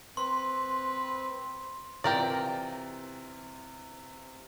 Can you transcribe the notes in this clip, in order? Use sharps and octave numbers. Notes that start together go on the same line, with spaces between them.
C4 B4 C6
C3 E3 F4 G4 A#4 D5